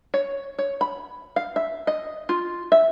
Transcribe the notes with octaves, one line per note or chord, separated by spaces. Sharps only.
C#5
C#5
B5
F5
E5
D#5
F4
E5